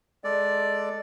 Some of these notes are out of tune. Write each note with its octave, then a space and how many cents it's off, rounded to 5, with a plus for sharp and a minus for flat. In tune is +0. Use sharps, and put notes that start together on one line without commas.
G#3 +10 A4 +0 D5 +0